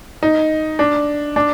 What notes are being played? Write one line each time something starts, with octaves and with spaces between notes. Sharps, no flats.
D#4
D4
D4